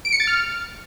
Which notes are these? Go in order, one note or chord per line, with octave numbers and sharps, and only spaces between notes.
D7
C#7
A6
F6